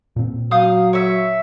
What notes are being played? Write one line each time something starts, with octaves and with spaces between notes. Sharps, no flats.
A#2 C4
F#3 F5 D#6 G6
C#5 E5